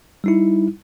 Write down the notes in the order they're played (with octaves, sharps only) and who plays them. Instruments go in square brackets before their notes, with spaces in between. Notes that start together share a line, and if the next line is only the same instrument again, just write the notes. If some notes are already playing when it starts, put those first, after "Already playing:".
[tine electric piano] G3 D#4 E4